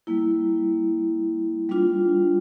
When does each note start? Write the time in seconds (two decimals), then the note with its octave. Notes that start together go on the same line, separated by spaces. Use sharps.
0.07 G3 A#3 E4
1.69 G3 D4 F4